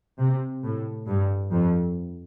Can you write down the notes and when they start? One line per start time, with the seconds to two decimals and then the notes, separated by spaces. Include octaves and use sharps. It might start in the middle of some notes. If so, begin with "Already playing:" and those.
0.19 C3
0.64 A2
1.08 G2
1.52 F2